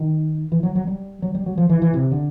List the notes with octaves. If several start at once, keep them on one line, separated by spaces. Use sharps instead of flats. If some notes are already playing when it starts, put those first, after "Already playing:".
Already playing: D#3
E3
F#3
F#3
G3
F#3
G3
F#3
F3
E3
E3
C3
D3